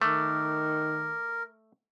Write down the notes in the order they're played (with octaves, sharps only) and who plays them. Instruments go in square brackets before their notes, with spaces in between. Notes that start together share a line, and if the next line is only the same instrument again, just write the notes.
[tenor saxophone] D#3 [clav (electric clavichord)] A3 [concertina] A#4 [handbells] D6